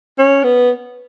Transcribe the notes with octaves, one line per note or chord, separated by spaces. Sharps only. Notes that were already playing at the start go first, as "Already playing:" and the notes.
C#4
B3